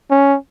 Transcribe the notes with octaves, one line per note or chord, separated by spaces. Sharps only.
C#4